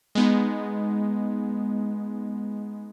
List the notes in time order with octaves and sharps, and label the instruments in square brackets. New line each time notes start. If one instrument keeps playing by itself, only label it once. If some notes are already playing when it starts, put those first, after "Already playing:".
[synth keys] G#3 B3 D#4